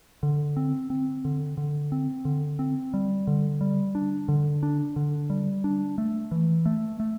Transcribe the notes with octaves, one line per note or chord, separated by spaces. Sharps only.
D3
C4
C4
D3
D3
C4
D3
C4
G3
D3
G3
D4
D3
D4
D3
G3
D4
A3
E3
A3
A3